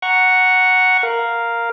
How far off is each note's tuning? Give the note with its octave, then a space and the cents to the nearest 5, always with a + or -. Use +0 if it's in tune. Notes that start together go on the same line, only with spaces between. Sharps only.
F#5 +0 A#5 +0 C#6 +0
A#4 +0 F5 +0